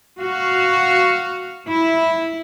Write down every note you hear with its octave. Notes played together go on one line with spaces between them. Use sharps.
F#4 F5
E4